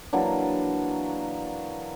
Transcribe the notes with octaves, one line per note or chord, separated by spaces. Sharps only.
E3 F#3 A#3 D4